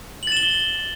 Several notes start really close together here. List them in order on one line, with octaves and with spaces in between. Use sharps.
F#7 A6 E7 G7